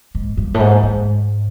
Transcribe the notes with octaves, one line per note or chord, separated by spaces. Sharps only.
G#2
G2
A2
G#2
G#2